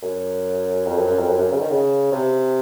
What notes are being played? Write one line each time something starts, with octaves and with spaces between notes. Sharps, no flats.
F#2
F2
F#2
F#2
F2
F#2
F#2
C#3
D#3
C#3
C3